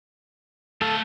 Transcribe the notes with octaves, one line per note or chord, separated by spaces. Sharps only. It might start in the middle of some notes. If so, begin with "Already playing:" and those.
A3 A4 F5